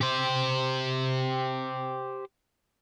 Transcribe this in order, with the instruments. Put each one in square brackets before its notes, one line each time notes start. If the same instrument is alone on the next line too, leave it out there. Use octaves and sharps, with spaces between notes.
[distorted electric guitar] G4 C5